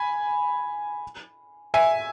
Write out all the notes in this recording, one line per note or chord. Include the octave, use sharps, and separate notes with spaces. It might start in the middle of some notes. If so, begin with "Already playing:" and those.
Already playing: G#5 B5
E5 G#5